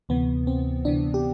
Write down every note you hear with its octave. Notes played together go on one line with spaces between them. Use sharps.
D2 C3 E3 B3
C4
D2 C3 E3 D4
G4